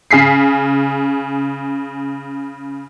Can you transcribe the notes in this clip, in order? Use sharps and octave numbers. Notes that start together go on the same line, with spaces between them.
C#3 G#4 B6 C7